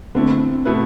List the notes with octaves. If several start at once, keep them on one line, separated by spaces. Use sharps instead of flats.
D3 A3 C4 E4
B2 A3 E4 B4